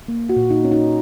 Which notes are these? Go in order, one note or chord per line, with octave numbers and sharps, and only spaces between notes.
A#3
F#4
A#2
D#4
C#4
D#4